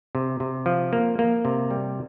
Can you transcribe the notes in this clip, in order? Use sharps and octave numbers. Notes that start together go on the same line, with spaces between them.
C3
C3
F3
A#3
A#3
C3
G3